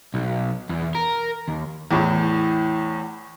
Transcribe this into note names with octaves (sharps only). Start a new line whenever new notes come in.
B1
E2
A#4
D#2
E2 A2